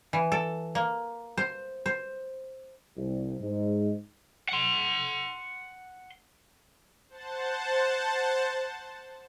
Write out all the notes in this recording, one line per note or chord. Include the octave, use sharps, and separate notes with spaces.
E3
A4
A#3
C5
C5
C2
G#2
F#5 C6
C5 F#5 A5